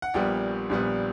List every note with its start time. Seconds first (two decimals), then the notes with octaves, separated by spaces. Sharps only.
0.02 F#5
0.14 A#1 A#2 G3 B3 G5
0.69 A#1 A#2 G3 B3